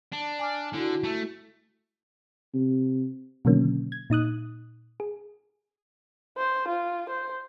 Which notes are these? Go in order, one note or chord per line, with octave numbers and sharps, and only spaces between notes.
D4
G#5 D6 F6
D3 E4 F#4
A3
C3
B2 D3 D#3 F#3 A#3 C#4
G#6
A#2 D#4 D#6 F#6
G#4
C5
F4
C5